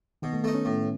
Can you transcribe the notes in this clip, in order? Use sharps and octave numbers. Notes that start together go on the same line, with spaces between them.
B2 D#3
A3
A3 B3 D#4
C#4
A2